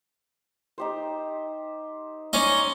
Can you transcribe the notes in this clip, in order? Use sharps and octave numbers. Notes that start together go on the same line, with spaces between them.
D#4 G4 C5
C#4 D#4 D5 D#5 C6